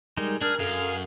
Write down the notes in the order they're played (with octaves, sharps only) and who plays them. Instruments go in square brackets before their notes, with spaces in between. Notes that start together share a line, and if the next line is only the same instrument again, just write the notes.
[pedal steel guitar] G3 G#3 D#4 [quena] A#4
[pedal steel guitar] D4 [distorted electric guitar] G#4 [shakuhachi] A#4 [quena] F6
[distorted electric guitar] F#2 [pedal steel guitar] G#4 F5 [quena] A4